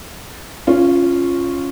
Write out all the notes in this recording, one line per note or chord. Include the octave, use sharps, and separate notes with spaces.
C#4 F4